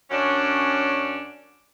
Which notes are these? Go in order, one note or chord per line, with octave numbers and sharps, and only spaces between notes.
F#2 C#4 D4